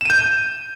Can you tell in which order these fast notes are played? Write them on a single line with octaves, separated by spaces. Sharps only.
E7 D#7 G6